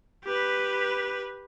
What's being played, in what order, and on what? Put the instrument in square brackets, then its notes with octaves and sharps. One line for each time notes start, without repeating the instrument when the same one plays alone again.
[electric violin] G4 B4